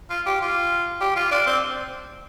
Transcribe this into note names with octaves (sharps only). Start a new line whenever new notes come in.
F4
G4
F4
G4
F4
D4
C4